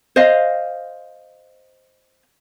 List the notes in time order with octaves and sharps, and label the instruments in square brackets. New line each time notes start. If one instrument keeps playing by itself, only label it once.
[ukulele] C5 D#5 F5